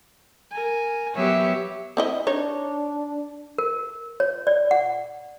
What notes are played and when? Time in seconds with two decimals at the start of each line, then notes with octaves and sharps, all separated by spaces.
0.51 A#4 G#5
1.15 F#3 B3 G4 C#5 E5
1.97 C4 E4 D#5
2.27 D4 D#4 C#5
3.58 A#4
4.20 C#5
4.47 D5
4.71 F#5